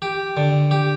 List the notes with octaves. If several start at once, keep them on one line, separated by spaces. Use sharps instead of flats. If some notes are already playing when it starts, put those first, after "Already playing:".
G4
D3
G4